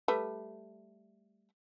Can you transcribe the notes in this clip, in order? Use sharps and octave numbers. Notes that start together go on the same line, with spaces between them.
G3 A3 B4